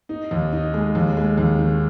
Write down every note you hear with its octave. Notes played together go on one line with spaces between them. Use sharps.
D#4
D#2
D#4
G#3
D#2
G#3
D#2
D#3